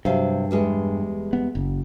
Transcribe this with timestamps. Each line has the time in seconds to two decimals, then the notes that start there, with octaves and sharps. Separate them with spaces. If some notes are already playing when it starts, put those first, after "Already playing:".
0.05 G2 C3 F#3 F5
0.51 E2 G3 G#3
1.33 B3
1.55 F#1